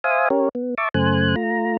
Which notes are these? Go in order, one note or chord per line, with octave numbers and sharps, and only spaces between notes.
C5 E5 F5 G#5 D#6
C#4 G4 A#4 C#5
B3
E5 A5 C#6 D6
F#2 C#3 A3 C5 G#5 F#6
A3 F4 A#5